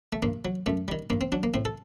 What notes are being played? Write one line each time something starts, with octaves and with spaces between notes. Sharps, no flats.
A3
G2 A#3
F#3
F#2 A3
D#3 G3
G2 A#3
C4
F#3 D4
A#3
A2 C4
A4